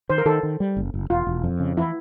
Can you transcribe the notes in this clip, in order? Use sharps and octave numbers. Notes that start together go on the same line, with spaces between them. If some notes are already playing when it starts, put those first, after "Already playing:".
D#3 C5
A#4
D#3 A4
D#3
G3
F#1
F#1
E1 F4
E1
F2
C#3
E3 E4